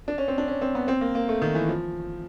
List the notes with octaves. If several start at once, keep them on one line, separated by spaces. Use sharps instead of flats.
D4
C#4
C4
D4
C#4
C4
B3
C4
A#3
A#3
A3
D#3
E3
F3